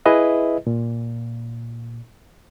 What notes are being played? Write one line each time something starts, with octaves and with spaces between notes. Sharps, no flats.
E4 G#4 B4 D#5 E5
A#2